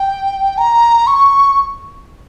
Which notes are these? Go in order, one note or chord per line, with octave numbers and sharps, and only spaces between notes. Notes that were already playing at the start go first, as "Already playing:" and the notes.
Already playing: G5
A#5
C#6